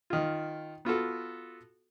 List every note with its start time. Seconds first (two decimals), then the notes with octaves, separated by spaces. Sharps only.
0.10 D#3 F4
0.85 B3 F4 F#4 A4